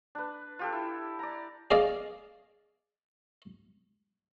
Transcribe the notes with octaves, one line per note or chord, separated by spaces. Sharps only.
D4 B4
F4 G4 A4
E4
D5 A#5
G#4 D5 D#5 F5